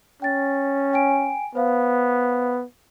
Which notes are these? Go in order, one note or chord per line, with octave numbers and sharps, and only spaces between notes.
C#4 G5 A6
G5 G#5 D7
B3 C5 F5